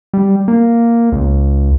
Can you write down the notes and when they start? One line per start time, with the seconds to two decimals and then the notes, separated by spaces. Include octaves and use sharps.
0.13 G3
0.48 A#3
1.12 C#2